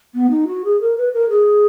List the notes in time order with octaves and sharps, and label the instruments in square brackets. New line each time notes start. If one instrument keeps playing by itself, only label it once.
[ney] B3
D#4
F#4
G#4
A#4
B4
A#4
G#4